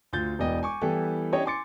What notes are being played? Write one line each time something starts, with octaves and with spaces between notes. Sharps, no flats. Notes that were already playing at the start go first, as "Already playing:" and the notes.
D2 F4 G6 A6
E1 E3 B3 D5 D#5 G5
G#5 C#6 D6
E3 G3 B3 E4 G4 A4
C#4 D4 E4 G4 C#5 D#5
G#5 C6 D6 A6 C#7